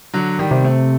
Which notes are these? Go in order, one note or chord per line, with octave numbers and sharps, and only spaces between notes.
D3 F#3
D#3 G3
C3
A3 C4